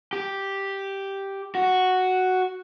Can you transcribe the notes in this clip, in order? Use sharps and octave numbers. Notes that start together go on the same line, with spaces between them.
G4
F#4